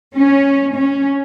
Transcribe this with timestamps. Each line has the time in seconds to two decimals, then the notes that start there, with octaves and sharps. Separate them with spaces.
0.16 C#4
0.75 C#4